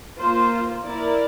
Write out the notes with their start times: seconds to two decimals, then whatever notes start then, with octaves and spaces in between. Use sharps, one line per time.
0.18 A#3 F4 C5
0.83 A#3 E4 A#4 D5